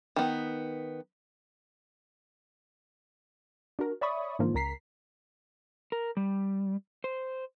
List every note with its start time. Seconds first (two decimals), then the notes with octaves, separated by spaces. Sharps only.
0.16 D#3 B3
3.79 D4 F#4 A#4
4.01 C#5 D5 E5 B5 C#6 D#6
4.39 G#2 D3 E3 F3 A#3 F4
4.54 C#2 A#4 A#5 B6 C7
5.92 A#4
6.17 G3
7.04 C5